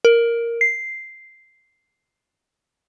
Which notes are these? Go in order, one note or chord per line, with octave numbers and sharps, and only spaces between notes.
A#4
C7